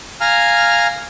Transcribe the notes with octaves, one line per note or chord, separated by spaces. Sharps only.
F5 G#5 A#5 F6